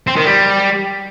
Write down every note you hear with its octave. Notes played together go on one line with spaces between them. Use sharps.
C4
D#3
G3